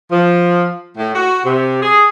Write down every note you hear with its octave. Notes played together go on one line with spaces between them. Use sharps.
F3
A2
F#4
C3
G#4